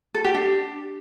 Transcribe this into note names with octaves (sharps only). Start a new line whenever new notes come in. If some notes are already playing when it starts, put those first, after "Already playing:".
A4
G4
D4